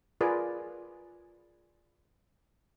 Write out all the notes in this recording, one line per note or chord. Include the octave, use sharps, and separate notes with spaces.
F4 G#4 A#4 B4 D5